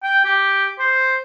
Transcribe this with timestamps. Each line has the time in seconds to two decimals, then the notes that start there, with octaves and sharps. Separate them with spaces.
0.04 G5
0.25 G4
0.79 C5